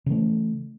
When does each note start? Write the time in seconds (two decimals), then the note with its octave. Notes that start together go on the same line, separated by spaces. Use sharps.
0.06 C#3
0.09 E3
0.11 A3